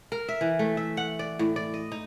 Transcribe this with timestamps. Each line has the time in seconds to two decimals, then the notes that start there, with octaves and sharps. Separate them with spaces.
0.12 A#4
0.28 E5
0.41 E3
0.59 A3
0.77 E5
0.97 F#5
1.19 D5
1.39 A2
1.56 D5
1.74 D#5
1.92 D#4